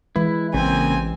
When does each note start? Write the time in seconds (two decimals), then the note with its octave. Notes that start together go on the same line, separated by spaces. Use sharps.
0.16 E3 G#3 E4 B4
0.54 A1 C#3 A#3 C4 G#5